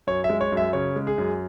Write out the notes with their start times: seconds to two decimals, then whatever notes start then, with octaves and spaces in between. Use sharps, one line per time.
0.07 F#2 C#5
0.24 E5
0.30 G#3
0.41 C#5
0.52 F#2
0.57 E5
0.73 C#3 C#5
0.96 G#3
1.07 G#4
1.18 F#2